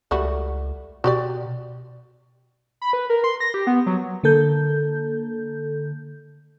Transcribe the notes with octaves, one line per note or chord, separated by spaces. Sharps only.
C#2 G3 A3 F#4
B2 F#4 G4 D5
B5
B4
A#4
C6
A#6
G4
B3
F#3
D3 A#3 A4 G6